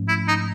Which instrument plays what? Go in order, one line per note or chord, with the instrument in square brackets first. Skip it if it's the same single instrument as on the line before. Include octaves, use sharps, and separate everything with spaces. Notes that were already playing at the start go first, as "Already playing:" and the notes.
Already playing: [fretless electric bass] G#2 F3 A3 C#4
[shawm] E4
D#4